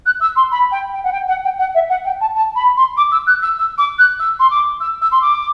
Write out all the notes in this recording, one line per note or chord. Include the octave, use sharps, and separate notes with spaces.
F#6
E6
C6
B5
G5
G5
F#5
G5
F#5
G5
F#5
E5
F#5
G5
A5
A5
B5
C6
D6
E6
F#6
E6
E6
D6
F#6
E6
C6
D6
E6
E6
C6
D6